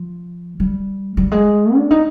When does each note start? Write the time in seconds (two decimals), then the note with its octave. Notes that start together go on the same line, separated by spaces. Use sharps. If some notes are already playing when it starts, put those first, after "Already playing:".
Already playing: F3
0.60 G3
1.17 G3
1.32 G#3
1.75 D4
1.91 D#4